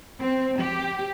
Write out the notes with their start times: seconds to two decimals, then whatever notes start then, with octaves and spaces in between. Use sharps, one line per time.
0.20 C4
0.60 G4